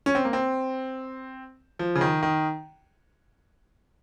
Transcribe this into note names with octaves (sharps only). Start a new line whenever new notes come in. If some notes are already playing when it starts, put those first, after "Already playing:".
C#4
C4
A#3
C4
F3
C#3
D#3
D#3